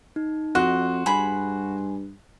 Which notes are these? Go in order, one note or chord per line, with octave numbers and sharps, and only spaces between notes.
D#4
F2 F#4 D#5 C6 F#6
G2 G#4 B5